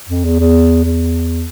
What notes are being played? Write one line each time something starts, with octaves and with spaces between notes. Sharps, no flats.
F2
E2
E2
E2